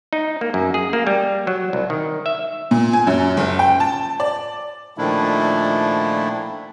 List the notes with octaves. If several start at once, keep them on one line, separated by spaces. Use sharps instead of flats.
D#4
A#3
F#2
G#4
A#3
G3
F#3
C2
D#3
E5
A#2
G#5
F#2
F#1
G5
A5
D5
A#2 D#3 F3 A3 D4 E4